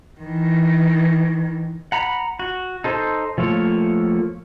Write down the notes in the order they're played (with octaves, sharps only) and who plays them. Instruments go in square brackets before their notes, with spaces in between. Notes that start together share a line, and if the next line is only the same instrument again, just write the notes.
[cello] D#3 E3
[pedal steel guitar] F#5 A#5 B5
F#4
D#4 A4 C5
F3 A3 A#3 C#5